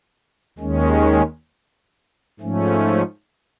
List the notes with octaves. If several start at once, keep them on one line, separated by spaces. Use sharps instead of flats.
D#2 D#3 G#3 C#4
G#2 F3 A3 C#4